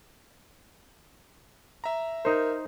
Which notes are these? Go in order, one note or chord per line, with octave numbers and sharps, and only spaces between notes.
E5 A#5
D#4 A#4 C5